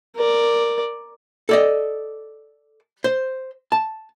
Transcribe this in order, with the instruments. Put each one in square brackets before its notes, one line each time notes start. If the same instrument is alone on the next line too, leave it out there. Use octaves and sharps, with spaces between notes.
[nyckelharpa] A#4 D5
[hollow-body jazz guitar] A4 D5 D#5
C5
A5